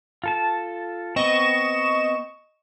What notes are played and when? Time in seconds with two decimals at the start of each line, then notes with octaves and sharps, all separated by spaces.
0.24 F4 A4 A5
1.16 B3 C4 D#5 C#6 E7